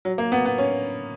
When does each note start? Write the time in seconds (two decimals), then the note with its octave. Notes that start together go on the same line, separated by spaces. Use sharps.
0.05 F#3
0.18 A#3
0.32 B3
0.45 B3
0.58 C#4